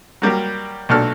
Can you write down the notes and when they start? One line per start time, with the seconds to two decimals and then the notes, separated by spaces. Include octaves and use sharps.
0.22 F#3 G3 A#3 G4
0.89 B1 A#2 D4 F#4 A4 F6